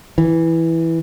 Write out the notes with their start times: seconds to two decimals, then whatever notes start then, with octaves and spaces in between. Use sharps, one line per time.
0.18 E3